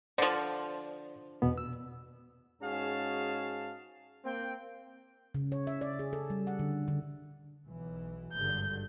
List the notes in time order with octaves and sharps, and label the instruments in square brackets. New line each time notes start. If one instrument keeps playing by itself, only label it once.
[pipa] D3 F3 [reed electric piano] C5 D5
[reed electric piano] E2 B2 B3
E6
[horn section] G#2 C#4 F#4 G#4 F5 A5
A#3 C4 G5
[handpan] C#3
C#5
E5
D5
G#4
A4
G3
F#5
D3
D3
[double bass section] B1 E3
[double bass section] G#1 G2 D3 [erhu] G6